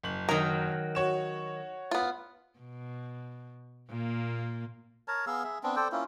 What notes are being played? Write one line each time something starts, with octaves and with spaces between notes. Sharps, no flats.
F#1 F#7
D#3 F#3 A#4
F#4 C#5 E7
B3 F4
B2
A#2 A#3
A#4 C#5 A5 A#5
B3 G#4 F5 E6
G#4 E5
B3 C4 D4
A4 C5 D5 G5
A#3 C#4 E4 F4